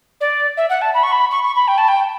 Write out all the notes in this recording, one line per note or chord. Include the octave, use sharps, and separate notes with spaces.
D5
E5
F#5
A5
B5
C#6
B5
C#6
C#6
B5
G5
A5
G5